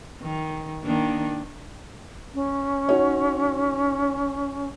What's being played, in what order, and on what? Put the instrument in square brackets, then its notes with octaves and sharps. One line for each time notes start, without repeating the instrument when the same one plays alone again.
[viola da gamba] D#3
D#3 A#3 D4
[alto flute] C#4
[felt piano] D#4 F#4 C#5